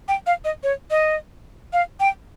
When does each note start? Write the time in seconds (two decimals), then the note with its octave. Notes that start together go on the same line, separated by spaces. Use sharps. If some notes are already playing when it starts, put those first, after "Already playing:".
0.08 G5
0.26 F5
0.44 D#5
0.63 C#5
0.90 D#5
1.73 F5
2.00 G5